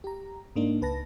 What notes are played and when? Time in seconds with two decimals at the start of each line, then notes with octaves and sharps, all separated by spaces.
0.04 G4 A#5
0.56 G#2 A#3 D4 D#4
0.81 C#2 B4 A5 A#6